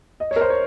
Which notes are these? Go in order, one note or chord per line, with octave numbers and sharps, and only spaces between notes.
D#5
C#5
A#4
C5
C#5